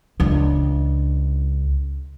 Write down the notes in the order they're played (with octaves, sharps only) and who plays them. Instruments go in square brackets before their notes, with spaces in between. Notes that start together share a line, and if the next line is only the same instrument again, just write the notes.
[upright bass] C#2 D4